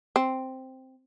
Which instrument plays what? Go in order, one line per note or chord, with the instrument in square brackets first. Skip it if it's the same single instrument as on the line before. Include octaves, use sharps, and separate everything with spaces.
[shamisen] C4